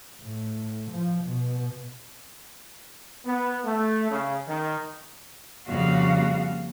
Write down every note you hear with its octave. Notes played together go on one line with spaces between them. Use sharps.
A2
F3
B2
B3
A3
C#3
D#3
F2 C#3 G3 A#3 F#4 F5